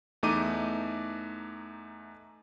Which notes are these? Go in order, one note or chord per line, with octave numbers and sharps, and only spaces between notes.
E2 A3 D#4 D6 D#7